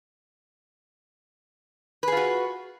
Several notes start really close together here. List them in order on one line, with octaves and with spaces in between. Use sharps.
B4 G#4 F4 F#4